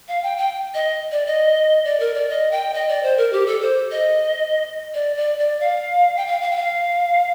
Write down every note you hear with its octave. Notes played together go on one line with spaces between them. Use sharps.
F5
G5
G5
D#5
D5
D#5
D5
A#4
D5
D#5
G5
D#5
D5
C5
A#4
G4
A4
C5
D#5
D5
D5
D5
F5
G5
F5
F5
G5
F5